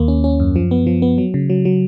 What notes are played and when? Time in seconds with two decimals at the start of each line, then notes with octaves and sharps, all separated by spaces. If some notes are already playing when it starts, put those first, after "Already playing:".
Already playing: D#2 A#3
0.08 C#4
0.24 C#4
0.40 F#2
0.56 F3
0.71 B3
0.87 F3
1.02 B3
1.18 F#3
1.34 C#3
1.50 F#3
1.65 F#3